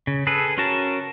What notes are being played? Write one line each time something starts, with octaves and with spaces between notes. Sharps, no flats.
C#3
G#4 A4 B4
C#4 F#4 A#4 A5